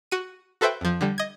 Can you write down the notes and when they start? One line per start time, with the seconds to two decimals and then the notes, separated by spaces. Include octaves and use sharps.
0.12 F#4 D#7
0.61 F#4 A4 B4 C5 E5 G5
0.81 F2 F3
1.01 D3 G3
1.18 D#5 G#6